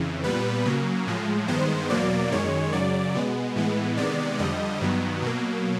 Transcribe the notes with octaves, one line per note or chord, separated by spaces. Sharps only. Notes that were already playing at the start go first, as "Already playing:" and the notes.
Already playing: F2 C#3 E3
A#2 G3 B3 B4
C#3 F#3 A#3
A2 F3 G#3
G2 D#3 G#3 B3 C5
E2 B2 F#3 A#3 D5
F#2 D#3 G#3 C#5
F#2 C#3 F#3 D5
B2 G#3 B3
A2 E3 G#3 B3
C3 D#3 G#3 B3 D5
F2 D3 G3 D#5
G2 D#3 F#3 B3
B2 F#3 A#3